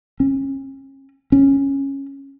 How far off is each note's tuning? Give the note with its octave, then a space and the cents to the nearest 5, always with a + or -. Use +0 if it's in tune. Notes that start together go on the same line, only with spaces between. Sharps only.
C#4 -35
C#4 -10